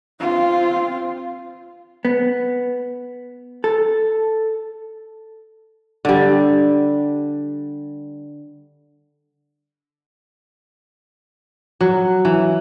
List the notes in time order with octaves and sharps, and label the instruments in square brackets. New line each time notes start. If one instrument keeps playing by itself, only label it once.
[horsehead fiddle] C4 F4
[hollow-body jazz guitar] B3
A4
[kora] D3 G3
F#3
E3